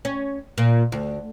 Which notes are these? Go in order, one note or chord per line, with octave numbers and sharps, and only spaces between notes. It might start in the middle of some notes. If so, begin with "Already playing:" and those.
C#4
A#2
D2